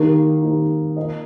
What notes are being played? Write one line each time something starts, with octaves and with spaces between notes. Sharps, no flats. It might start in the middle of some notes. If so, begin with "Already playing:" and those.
Already playing: D#3 A#3 D#4 G4 A#4
D#3 A#3 D#4 G4 A#4
A#3 F4 A#4 D#5